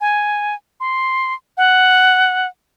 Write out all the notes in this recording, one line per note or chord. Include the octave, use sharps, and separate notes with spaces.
G#5
C6
F#5